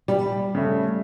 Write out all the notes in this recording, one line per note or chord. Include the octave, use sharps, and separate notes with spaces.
G3
C#3 A3